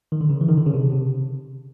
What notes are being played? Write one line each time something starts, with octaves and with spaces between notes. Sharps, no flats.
D#3
D3
C#3
E3
D#3
D3
C#3
C3
C3